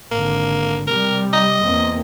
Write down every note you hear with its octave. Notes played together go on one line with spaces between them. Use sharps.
G#1 D3 A#3
C3 G3 A#4
D#5
E2 A#3 C4